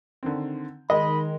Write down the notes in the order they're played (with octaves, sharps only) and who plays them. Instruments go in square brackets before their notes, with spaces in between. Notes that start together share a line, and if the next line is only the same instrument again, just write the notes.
[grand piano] D3 D#3 C4
[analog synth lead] D#3 [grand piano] G#3 [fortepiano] D#5 [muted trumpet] B5